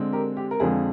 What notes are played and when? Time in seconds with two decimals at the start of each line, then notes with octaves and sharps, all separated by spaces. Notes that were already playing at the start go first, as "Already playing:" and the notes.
Already playing: D3 G#3 C4
0.13 G4 A#4
0.37 G4
0.51 A#4
0.60 F2 D3 F3 G#3 G#4